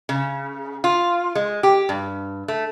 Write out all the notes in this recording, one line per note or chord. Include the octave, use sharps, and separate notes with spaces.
C#3
F4
G#3
G4
G2
A3